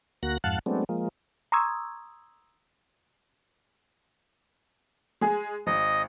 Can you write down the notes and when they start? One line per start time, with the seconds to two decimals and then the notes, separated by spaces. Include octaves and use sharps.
0.23 D2 A#3 F#4 F#6 A#6
0.44 F2 G#2 F5 F#5 A5 F#6
0.66 F#3 G#3 A3 B3 C4 D4
0.89 F3 G#3 A#3
1.52 A#5 C6 C#6 D#6 E6 G#6
5.21 G#3 G#4
5.67 G#1 D#5